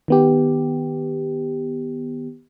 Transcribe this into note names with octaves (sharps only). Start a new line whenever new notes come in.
D#3 B3 G4